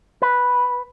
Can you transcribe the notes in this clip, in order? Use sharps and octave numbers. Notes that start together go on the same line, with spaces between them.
B4